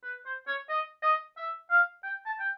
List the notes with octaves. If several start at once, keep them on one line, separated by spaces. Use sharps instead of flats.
B4
C5
C#5
D#5
D#5
E5
F5
G5
A5
G5